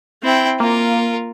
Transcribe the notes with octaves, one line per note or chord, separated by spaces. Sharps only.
C4 E4 G5
A#3 F4 A#4